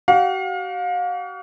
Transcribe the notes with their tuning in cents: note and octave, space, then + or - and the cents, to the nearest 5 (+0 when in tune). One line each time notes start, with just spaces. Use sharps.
F#4 +45 F5 +35